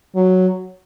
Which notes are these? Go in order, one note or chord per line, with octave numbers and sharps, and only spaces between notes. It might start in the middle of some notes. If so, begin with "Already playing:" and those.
F#3